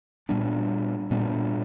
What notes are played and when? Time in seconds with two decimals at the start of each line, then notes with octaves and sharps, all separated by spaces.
0.29 A#2 G3 B3 D4
1.11 A#2 G3 B3 D4